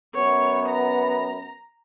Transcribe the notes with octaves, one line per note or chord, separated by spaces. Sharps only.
F#2 B3 C#5
A#5